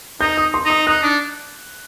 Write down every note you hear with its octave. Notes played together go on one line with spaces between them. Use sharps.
D#4 G6
D#6
C6
D#4 D#6
D#4 F#6
D4